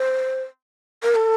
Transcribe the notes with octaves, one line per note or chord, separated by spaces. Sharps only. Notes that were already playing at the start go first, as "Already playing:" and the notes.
Already playing: C5
A#4
A4